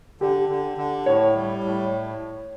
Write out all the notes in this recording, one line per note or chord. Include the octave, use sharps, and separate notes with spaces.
D3 G4
D3
D3
A2 C#5
G3
A2